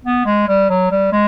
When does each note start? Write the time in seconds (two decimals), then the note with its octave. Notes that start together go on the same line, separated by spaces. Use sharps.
0.05 B3
0.26 G#3
0.48 G3
0.70 F#3
0.91 G3
1.13 G#3